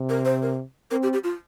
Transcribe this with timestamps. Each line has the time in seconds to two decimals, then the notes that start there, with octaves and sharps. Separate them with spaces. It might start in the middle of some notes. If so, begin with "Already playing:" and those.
Already playing: C3
0.09 A#4
0.25 C5
0.42 A#4
0.91 C4 A#4
1.03 G4
1.13 G4
1.24 F4